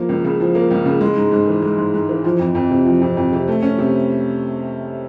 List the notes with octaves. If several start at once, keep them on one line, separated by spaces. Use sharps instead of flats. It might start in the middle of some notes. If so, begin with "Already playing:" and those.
Already playing: F3 A#3
C#2
C#3
F3
A#3
C#2
C#3
G#3
G#2
G#2
E3
G#3
G#2
G#2
E3
F3
F2
F2
C3
F3
F2
F2
C3
A3
C#4
C3